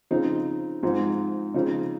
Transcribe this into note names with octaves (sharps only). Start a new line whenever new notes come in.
C#3 F3 C4 D#4
G#2 F3 G#3 C4 D#4
C#3 F3 C4 D#4